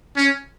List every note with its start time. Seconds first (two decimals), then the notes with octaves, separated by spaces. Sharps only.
0.16 C#4